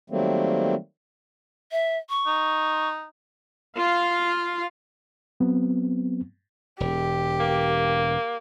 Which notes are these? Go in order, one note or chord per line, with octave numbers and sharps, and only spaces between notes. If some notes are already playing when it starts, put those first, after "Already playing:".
D#3 F#3 G3 A3 A#3 C4
E5
C#6
D#4
F4 F5
F#3 B3 C4
E1 G4
A#3